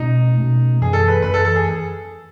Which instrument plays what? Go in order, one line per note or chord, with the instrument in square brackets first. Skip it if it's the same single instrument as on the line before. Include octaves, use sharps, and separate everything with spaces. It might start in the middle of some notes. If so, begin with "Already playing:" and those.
Already playing: [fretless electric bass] B2 A3 C#4 [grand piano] D#4
[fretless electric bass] B2 A3 C#4
[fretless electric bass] F#2 E3 A3 [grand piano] G#4
[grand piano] A4
B4
[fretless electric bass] F#2 E3 A3 [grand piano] B4
[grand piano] A4
A4
G#4